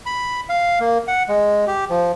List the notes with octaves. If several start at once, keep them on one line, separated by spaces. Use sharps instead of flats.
B5
F5
A#3
F#5
G#3
G4
F3